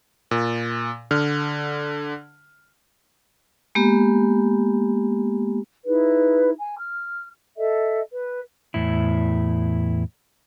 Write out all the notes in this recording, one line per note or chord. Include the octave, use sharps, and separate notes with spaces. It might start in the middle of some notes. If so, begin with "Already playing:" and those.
A#2
D3 F6
G#3 A#3 B3 G4
D#4 E4 G#4 B4
G#5
F6
A4 D#5 E5
B4
E2 A2 E4